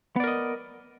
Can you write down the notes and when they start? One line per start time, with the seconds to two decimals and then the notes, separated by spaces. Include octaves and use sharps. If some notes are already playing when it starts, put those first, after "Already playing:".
0.16 B3
0.20 D5
0.24 A#4
0.27 D#5